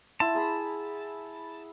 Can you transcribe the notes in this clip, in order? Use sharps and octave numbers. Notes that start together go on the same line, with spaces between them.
E4 F#5 A5 C6
G#4 A#5 B5